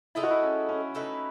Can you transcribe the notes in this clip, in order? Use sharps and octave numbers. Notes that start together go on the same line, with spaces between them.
G#3 D#4 E4 A4
F#4
E4
C#4
C#4
A3 D#4 E4 B4